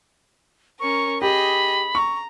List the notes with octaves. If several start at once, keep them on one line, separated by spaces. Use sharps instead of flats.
C#4 A#4 C#6
G4 G#4 D#5 B5
A#5 C#6